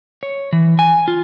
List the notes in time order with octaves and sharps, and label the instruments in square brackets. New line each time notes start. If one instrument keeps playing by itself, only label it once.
[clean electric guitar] C#5
E3
G#5
F4